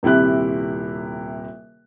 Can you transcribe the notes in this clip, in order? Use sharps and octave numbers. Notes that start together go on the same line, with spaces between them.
D#1 C3 E4 G4 F#6